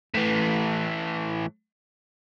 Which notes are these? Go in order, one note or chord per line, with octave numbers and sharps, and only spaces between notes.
A2 E3